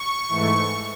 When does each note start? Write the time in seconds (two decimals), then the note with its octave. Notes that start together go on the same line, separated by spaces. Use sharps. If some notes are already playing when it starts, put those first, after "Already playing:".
Already playing: C#6
0.28 G#2 E3 A3